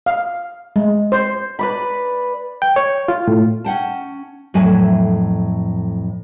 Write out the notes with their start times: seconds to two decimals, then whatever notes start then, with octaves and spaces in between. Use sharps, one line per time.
0.06 F5
0.76 G#3
1.12 C5
1.59 B4 D5 B5
2.62 G5
2.76 C#5
3.08 F4
3.28 A2
3.64 C#4 F#5 G5 A5
4.54 F2 A2 F#3 E5 G#5